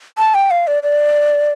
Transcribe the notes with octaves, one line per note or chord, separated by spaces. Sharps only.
A5
G5
F5
D5
D5